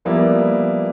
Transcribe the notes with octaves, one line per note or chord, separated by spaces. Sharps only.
F3 G3 A#3 B3 E4